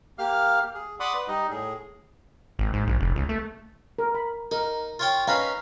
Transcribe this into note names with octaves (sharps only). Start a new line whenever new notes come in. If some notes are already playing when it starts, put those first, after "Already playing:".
A#3 G4 F5 F6
G#4
D5 F#5 B5 C6 D6 D#6
B4
G3 D#4 D#5
A2 G#4
G#1
G#2
A#1
F1
C#2
A3
A#4
B5
D#4 A#4
F4 C#5 G5
C#4 D#4 B4 F5 A#5 B5